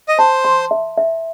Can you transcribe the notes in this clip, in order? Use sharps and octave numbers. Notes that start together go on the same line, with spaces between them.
D#5
C5 A5
C6
E5
E5